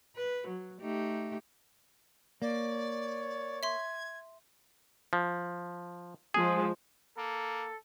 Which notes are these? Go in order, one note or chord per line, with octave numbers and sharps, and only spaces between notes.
B4
F#3
A3 D#4 G4
A#3 C#5 D5
E5 C6 G#6
F3
F3 G#3 G#4
A#3 A4